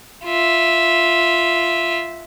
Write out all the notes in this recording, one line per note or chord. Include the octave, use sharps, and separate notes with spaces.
F4 E5